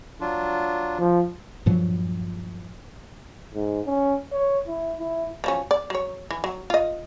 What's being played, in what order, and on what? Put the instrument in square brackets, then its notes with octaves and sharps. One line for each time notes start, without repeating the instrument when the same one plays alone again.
[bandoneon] F#3 D4 F4
[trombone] F3
[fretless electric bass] G2 A#2 F3 F#3
[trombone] G#2
C#4
C#5
E4
E4
[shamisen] F3 F#3 C#4
D5
F#3 C#5
E3
F#3
F4 D#5